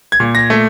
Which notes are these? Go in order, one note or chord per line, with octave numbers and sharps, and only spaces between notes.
G#6
A#2
A#6
A3